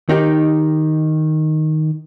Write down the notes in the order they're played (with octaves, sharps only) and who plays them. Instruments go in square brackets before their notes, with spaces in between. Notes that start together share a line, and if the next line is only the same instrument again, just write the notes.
[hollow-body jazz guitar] D#3 D#4 G4